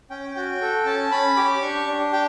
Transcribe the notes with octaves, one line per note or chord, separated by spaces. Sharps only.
C#4 G5
F#4 G5
A4
C#4 A5
C#4 B5
G4 D6
D4 C#6
D4
G4 G5